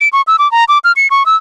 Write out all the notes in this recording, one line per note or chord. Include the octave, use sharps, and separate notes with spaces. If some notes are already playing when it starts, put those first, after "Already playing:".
D7
C#6
E6
D6
A#5
D6
F6
C#7
C#6
E6